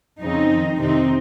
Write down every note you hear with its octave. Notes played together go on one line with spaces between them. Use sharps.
F2 C#3 C4 D#4
F2 D#3
F2 C3 D#3 C4 D#4